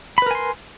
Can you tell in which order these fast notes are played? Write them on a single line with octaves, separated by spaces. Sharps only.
B5 B4 A#4 G#5 C6